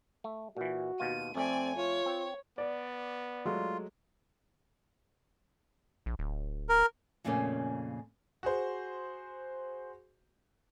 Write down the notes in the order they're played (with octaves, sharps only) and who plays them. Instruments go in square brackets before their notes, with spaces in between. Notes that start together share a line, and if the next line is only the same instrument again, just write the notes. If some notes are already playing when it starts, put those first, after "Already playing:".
[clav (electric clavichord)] A3
[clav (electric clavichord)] A#2 E3 [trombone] F#4
[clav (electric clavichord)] D#2 B2 F4 [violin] D#7
[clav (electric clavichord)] F2 A3 [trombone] C4 [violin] D5 G#5
[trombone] F4 [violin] C#5
[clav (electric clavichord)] C4
[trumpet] B3 [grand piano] D5
[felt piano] F#3 G#3 A3 [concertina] F4
[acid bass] A#1
D1
[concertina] A#4
[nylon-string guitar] F2 A#2 C#3 A3 A#3 C#4
[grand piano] F#4 G#4 C5